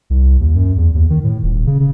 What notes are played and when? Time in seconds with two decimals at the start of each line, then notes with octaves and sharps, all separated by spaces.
0.10 C2
0.40 D#2
0.55 F#2
0.77 E2
0.94 D#2
1.10 D#3
1.24 A2
1.43 D#1
1.67 C#3
1.80 C#3